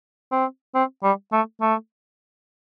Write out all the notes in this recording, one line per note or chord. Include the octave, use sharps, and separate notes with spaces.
C4
C4
G3
A3
A3